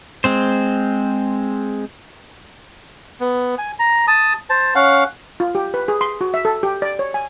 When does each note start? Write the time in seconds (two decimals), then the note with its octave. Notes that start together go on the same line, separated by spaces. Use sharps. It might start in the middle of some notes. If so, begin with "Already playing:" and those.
0.24 G#3 C4 C5
3.20 B3
3.58 G#5
3.79 A#5
4.08 A5 D#6
4.50 C5 A5
4.75 C#4 F5 F#5
5.40 F4
5.55 G4
5.74 B4
5.88 G#4
6.01 C6
6.21 F#4
6.34 E5
6.45 A4
6.63 G4
6.82 D5
6.99 C#5
7.14 G#5